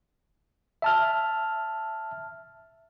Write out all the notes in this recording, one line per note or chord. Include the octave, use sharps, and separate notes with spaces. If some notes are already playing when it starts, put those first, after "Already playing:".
E5 A5 F6